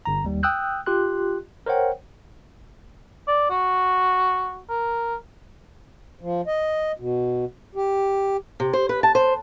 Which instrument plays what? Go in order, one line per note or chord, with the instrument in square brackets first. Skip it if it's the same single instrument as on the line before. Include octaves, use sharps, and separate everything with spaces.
[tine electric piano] G1 A#5
D#2 G3
G5 D#6 E6 F#6 G6
F4 G4 C6 F#6
A#4 C5 C#5 F#5 G5
[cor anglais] D5
F#4
A#4
[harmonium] F3
D#5
B2
G4
[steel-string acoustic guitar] C3
C5
B4
A5
C5